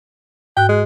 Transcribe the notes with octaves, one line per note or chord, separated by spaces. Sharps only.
G#2 G5 F#6
G#3